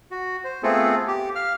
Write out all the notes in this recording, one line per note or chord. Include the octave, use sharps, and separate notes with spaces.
F#4
C5
A3 B3 C4 F4 G#4 A4
G4
F5 F6